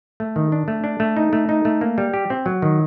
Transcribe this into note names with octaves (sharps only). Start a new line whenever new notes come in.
A3
D#3
D4
A3
D4
A3
D#4
A3
D#4
A3
A#3
G3
G4
C4
F#3
D#3